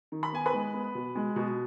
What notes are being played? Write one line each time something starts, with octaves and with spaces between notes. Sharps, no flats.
D#3
B5
B3 G#5
B4 B5
G#3
B3
B2
G#3
B2